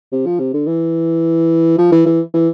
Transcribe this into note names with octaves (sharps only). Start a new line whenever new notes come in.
C3
F3
C3
D3
E3
F3
E3
E3
E3